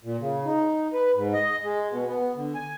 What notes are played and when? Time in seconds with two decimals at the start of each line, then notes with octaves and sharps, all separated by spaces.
0.04 A#2
0.20 C#3
0.46 D#4
0.93 B4
1.15 G#2
1.34 D#5
1.63 G#3
1.91 B2
2.07 B3
2.36 D3
2.55 G#5